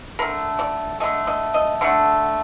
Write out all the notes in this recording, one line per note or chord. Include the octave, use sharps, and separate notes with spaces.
D3 A3 A#4
D5
D3 A3 D#5
D#5
D#5
D3 A3 F#5